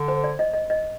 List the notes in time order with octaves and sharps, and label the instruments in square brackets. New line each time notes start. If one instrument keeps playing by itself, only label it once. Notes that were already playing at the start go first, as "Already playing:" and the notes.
Already playing: [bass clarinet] D3
[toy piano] C5
D5
D#5
D#5
D#5